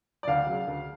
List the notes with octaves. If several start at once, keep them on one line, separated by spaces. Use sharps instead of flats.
D5
D2 F5
C#3 F#3
D2